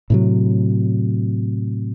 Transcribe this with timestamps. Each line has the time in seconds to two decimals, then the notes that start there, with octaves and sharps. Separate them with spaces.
0.10 A2 C3 F#3